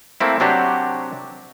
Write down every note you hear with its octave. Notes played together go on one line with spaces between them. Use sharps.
A3 A#3 C4 E4
C3 F#3 D4 F#4 G4